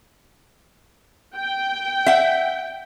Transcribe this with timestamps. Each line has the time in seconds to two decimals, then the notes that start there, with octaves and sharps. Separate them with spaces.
1.36 G5
2.06 E5 F#5